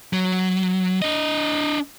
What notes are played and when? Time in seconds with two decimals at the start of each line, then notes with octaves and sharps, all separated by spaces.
0.13 F#3
1.02 D4 D#5